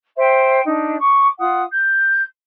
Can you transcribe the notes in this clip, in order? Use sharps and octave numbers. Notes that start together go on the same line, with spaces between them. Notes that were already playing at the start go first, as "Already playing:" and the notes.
C5 E5 G5
D4 D#4
C#6 D6
F4 F#5 D#6
G6